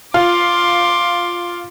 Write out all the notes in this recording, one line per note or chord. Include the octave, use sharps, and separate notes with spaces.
F4 C6 D6